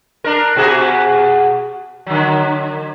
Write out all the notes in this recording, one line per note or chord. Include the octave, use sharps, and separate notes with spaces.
D4 A#4
B2 F#4 G#4
D3 F#3